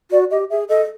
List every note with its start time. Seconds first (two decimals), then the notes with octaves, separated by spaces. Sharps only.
0.11 F#4 D5
0.31 G4 D#5
0.50 G#4 E5
0.69 A4 D#5